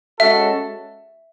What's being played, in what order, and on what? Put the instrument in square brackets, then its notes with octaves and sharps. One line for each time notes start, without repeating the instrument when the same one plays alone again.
[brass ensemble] G#3 C#4 F#4 A4 [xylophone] E5